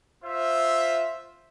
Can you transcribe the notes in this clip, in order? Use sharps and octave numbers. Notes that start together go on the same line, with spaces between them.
F4 C5 E5